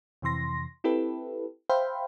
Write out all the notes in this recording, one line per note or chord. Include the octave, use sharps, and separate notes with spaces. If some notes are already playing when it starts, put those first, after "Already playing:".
F2 C3 E3 C6 A#6
C4 E4 G4 A4 B4
C5 E5 F5 G5 B5